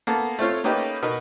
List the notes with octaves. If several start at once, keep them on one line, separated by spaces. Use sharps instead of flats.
A#3 B3 A4
A3 C4 F4 C#5
A3 A#3 C#4 D#4 G4 B4
B2 D#4 A#4 B4